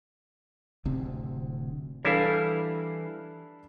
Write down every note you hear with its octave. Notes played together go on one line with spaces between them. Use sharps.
D1 D2 C3 C4
E3 G3 D4 E4 A4 B4 F5